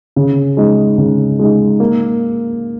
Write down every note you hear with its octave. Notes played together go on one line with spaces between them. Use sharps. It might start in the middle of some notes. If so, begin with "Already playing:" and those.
C#3
G#3 D#4
C#3
G#3 D#4
A#3